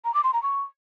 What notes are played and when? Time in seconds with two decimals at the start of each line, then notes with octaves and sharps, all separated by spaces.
0.05 A#5
0.14 D6
0.24 C6
0.33 A#5
0.43 C#6